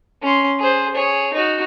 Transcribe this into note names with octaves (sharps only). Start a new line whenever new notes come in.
C#4 C6
G#4 C5
G#4 C#5
D#4 F#4